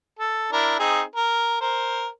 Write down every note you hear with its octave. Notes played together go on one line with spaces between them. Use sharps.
A4
D4 E4 A#4
C4 D#4 G#4
A#4
A#4 C5